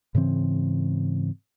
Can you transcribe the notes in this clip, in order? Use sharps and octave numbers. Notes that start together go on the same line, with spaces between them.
G#2 C#3 E3 C4